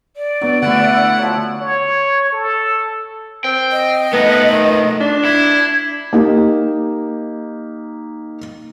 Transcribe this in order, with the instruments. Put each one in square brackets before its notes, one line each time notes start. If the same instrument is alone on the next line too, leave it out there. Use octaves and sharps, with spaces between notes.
[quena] D5
[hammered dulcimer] F#3 [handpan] B3 D4
[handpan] D3 A3 [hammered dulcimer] E4 E5 G#5 [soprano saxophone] F#5
[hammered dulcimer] F3 F#3
[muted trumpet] C#5
A4
[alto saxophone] C4 [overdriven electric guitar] G5
[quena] D#5
[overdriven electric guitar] A3 D#4 [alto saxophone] B3
[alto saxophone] D#3
D4
[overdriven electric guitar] E4 [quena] G#6
[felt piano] A#3 D#4 G4